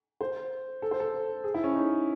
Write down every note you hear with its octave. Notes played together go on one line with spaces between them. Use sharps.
C5
A4
C5
A4
G#4
E4
C#4
D#4